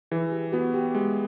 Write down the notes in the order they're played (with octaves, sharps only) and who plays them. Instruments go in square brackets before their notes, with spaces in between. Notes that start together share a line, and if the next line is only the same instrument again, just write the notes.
[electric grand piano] E3 [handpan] G#4
[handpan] G4
[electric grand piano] B3 [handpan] F#4
[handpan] G4
[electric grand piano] G#3